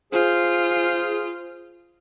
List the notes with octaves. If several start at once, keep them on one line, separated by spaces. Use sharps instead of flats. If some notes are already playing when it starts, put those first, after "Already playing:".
F4 G#4 C5